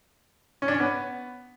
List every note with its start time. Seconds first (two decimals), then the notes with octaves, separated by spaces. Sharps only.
0.62 C#4
0.68 D4
0.74 C#4
0.80 B3